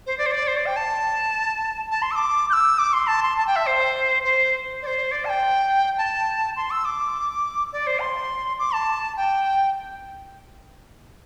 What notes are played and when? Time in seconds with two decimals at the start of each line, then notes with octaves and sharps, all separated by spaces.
0.06 C5
0.18 D5
0.26 C5
0.32 D5
0.47 C5
0.57 D5
0.66 G5
0.76 A5
1.91 A5
2.02 C6
2.11 E6
2.15 D6
2.50 G6
2.53 E6
2.79 D6
2.93 C6
3.07 A5
3.23 C6
3.37 A5
3.47 G5
3.56 E5
3.66 C5
4.24 C5
4.82 D5
4.87 C5
5.11 D5
5.25 A5
5.29 G5
5.98 A5
6.56 C6
6.71 E6
6.85 D6
7.72 D5
7.87 C5
8.01 C6
8.59 D6
8.73 A5
9.17 G5